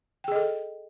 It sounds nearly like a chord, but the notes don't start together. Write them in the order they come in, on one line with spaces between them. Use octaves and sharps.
G5 G#4 D#5 A4